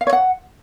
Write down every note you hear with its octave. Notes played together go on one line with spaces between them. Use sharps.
F5
C#5
F#5